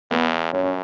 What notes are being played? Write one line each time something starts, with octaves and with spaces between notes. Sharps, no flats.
E2 B3
F#2 C#4
C#4